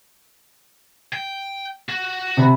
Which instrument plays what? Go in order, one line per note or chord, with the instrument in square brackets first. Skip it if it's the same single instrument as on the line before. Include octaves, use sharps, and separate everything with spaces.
[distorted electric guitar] G5
F#4
[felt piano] C3 B5